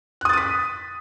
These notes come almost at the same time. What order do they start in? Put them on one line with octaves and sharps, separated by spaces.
F#6 D#6 A6 D#7 B6